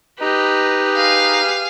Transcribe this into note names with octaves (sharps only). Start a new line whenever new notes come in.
D#4 G4 B4 D#5 A#5
G#4 F5